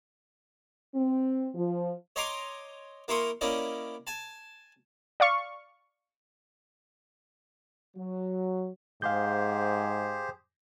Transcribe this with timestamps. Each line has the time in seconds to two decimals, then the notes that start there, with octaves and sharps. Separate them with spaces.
0.94 C4
1.54 F3
2.16 C#5 D#5 G#5 A#5 C6 D6
3.08 A#3 E4 A#4 C6 C#6 D#6
3.41 A#3 C#4 E4 D5 D#5
4.07 G#5 A5
5.20 D5 F5 C#6
7.96 F#3
9.02 G#2 G4 G#4 C5 F5 G6